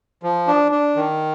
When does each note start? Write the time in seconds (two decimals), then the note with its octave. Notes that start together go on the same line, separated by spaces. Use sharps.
0.23 F3
0.48 D4
0.72 D4
0.96 D#3